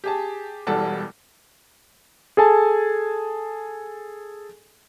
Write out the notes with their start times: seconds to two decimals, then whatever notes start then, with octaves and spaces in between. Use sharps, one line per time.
0.04 G4 G#4 A5
0.67 E1 E2 G3 A4 F#5 A5
2.37 G#4 A4 G#5 A5